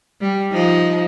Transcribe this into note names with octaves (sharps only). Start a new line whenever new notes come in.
G3
F3 D#4